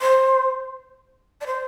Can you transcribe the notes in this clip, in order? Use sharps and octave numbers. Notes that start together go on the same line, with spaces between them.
C5
D5
C5